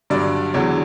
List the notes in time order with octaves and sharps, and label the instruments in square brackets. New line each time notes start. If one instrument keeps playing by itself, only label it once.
[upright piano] G2 D3 F#3 D5
E2 D3 F#3 C#5